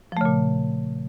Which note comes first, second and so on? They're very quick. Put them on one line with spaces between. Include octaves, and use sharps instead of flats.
F3 A3 C#3 A#2